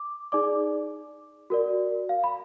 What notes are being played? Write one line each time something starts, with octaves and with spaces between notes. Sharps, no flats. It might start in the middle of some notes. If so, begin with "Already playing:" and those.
Already playing: D6
D#4 G#4 D5 D6
F#4 A#4 D5
F5
B5